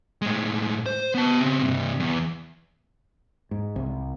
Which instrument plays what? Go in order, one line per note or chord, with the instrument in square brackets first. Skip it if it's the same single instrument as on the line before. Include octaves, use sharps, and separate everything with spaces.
[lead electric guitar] A2 G#3
C5
B3 A5
C#3 C4
G2 C3
E2
[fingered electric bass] G#2
C2